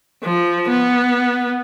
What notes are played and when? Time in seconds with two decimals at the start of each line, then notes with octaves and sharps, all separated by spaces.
0.24 F3
0.69 B3